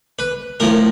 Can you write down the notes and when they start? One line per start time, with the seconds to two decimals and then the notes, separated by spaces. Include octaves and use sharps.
0.19 B4
0.60 A2 F3 A#4